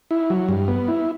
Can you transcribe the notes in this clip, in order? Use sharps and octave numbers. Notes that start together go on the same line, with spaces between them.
E4
F#3
G2
B3
E4